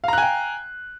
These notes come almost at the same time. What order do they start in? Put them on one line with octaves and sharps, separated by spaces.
F5 A#5 F#6 G#5 G5